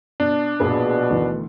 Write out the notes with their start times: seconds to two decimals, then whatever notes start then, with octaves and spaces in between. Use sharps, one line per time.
0.20 B2 D4
0.60 A#1 B2 G#4 B4
1.10 D2 D#3 E3